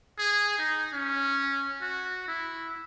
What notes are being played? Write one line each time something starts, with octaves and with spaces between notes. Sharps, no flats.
G#4
D#4
C#4
F#4
E4